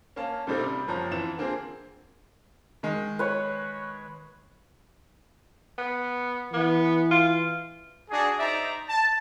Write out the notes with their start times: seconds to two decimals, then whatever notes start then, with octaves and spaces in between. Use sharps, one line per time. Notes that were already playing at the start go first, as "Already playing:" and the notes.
0.16 A#3 C#4 F5 A5
0.47 A#2 C#3 G3 C4 D#4 A4
0.60 C3 G3
0.88 F#1 F3 C#4 A#5
1.11 F2 E3 E7
1.38 D3 A#3 C4 F4 G#4
2.83 D#3 G#3
3.19 B4 C#5
5.78 B3
6.54 E3 B3
7.11 F4
8.11 D4 F#4 G#4
8.39 D#4 C5 D5 E5 A#5
8.89 A5